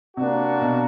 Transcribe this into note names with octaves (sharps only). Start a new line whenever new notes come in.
C3 A#3 D4 F#4
B2